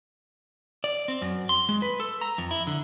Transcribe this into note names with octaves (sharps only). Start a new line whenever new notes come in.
D5
C4
F#2
C6
G#3
B4
A4
A#5
F2
E4
D3